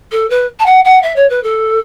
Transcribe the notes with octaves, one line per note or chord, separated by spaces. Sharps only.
A4
B4
A5
F#5
F#5
E5
C#5
B4
A4